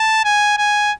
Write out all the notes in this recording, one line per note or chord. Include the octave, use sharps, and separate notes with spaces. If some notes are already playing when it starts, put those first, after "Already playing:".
Already playing: A5
G#5
G#5